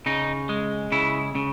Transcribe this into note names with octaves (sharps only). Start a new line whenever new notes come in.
C#3 D#4
G#3
C#3 E4
C#3